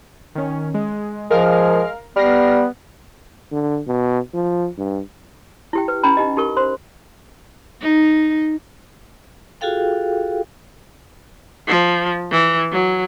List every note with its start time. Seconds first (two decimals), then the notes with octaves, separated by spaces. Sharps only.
0.35 D#3 C#4
0.74 G#3
1.30 F3 G#3 A#4 F5 F6
2.16 G3 B3 F6 A#6 C7
3.52 D3
3.87 B2
4.34 F3
4.78 G2
5.73 E4 G4 G5
5.88 B4
6.03 C#4 G5 A#5 B5
6.17 D#4 G4 D#5
6.37 D#4 G4 A#4 C#6
6.57 C5 C6
7.81 D#4
9.61 F4 F#4 G#4 A4 F5 G5
11.67 F3
12.31 E3
12.72 F#3